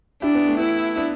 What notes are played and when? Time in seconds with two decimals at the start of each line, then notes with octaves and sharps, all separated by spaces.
0.22 D4 E4 G4
0.35 B3
0.48 A3
0.60 B3 E4
0.97 B3 D4